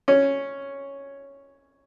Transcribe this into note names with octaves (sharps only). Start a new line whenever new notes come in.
C#4